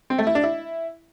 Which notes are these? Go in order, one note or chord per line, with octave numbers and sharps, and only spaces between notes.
C4
A3
E4
D4
E4